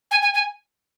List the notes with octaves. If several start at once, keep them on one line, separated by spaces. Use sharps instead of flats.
G#5
G#5
G#5